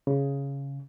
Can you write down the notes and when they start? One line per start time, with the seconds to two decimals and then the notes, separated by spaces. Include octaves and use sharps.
0.07 C#3